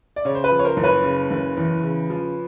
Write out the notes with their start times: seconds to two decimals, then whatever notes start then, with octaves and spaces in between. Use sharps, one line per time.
0.16 D5
0.25 C#3 C#5
0.35 C5
0.44 B4
0.51 F3
0.59 C#5
0.65 A#4 C5
0.77 F#1
0.84 B4 C#5
1.04 C#3
1.31 F#1
1.57 E2
1.83 C#3
2.10 F3